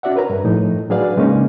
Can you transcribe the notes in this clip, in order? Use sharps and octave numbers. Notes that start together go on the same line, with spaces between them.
C#4 D4 F#4 D5 E5 F#5
A#4 B4 C#5 A#5
G2
A2 F3 D#4
F#3 D4 G#4 B4 D5 F5
C#3 G#3 A#3 C#4 D#4